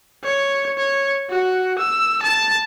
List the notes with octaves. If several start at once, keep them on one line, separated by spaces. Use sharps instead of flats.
C#5
C#5
F#4
E6
A5